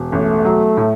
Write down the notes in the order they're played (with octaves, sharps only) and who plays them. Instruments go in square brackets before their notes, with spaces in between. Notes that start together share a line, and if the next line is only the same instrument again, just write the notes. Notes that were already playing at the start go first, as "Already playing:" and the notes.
Already playing: [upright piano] E1
[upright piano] A1 [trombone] A3
[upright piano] F#3
A2